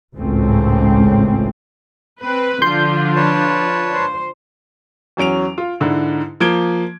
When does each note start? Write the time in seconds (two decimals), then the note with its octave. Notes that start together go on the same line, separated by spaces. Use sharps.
0.17 G#1 C#2 A2 A3 C4 C#4
2.22 C4 B4
2.62 D3 F3 D4 F4 C6 G6
3.15 B4 C#5 A5
3.94 C5
5.17 E2 F#3 C#4 D7 F7
5.58 F4
5.80 G#2 D3 E4
6.40 F3 A#3 G#6 D7 G7